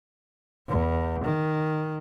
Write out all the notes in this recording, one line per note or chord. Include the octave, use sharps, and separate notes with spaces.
E2
D#3